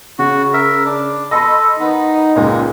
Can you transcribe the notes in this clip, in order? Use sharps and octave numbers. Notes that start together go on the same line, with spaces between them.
C#3 F#4
A#4 E5
D4
A4 D#5 B5 C6
D#3 B3 D#4
C#2 A#2 G#3